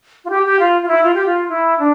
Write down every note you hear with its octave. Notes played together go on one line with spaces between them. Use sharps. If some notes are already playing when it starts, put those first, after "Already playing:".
F4
G4
G4
F4
F4
E4
F4
G4
F4
E4
D4